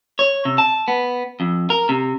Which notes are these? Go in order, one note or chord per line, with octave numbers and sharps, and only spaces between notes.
C#5
C3
A5
B3
F2
A#4
C3